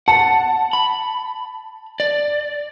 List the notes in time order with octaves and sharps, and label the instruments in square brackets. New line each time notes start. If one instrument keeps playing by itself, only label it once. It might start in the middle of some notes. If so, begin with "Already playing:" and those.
[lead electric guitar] F#5 [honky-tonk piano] A5
[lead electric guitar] B5
D5